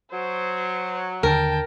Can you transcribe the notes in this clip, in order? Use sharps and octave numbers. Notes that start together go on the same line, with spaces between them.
F#3 C5
D#2 D3 A#4 G5 A5